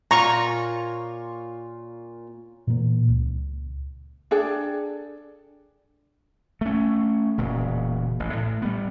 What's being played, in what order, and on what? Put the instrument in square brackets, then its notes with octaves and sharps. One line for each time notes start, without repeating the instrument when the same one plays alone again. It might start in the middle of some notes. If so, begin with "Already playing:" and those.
[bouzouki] A#2 F4 C#5 [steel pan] A#5 C#6
[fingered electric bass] A#2 E3 A#3
C#2
[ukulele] D4 G#4 A4 G5
[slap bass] A3 C#4
E1 A#2 C#3
A1
A2
G3 B3